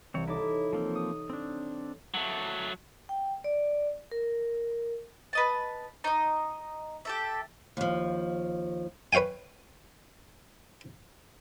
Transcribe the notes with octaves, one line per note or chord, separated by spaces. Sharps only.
C2 E3 C4 C#5
D#4 E4 A4 C#5 D6
F3 A#3 C4
C#6 D#6
C4 D4
F#3 A3
G5
D5
A#4
B4 D#5 A5
D#4 D#5
G4 A4 E5
D#2 F3
B4 C#5 F5 G5 G#5